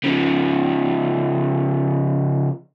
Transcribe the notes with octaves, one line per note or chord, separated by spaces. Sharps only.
C#3 F3